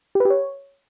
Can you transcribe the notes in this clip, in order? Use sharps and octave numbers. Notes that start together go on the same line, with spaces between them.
G4
B4
G4
C#5